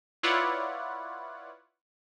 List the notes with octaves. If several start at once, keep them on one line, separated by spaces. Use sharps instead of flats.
E4 F4 B4 C#5 D5 F#5